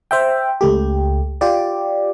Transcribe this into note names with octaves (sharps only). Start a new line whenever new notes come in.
C5 E5 G5
C#2 A3 G4
F4 G4 D5